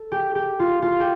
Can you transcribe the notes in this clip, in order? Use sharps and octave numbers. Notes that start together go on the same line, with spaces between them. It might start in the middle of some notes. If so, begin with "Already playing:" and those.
Already playing: A4
G4
G4
F4
F4
G4